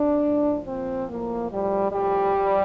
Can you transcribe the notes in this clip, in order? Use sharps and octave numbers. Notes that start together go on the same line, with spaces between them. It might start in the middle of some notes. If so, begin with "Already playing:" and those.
Already playing: C3 D4
A2 F3
A#2 F3 C4
A2 F3 A#3
A2 F3 G3
A2 F3 G3
F3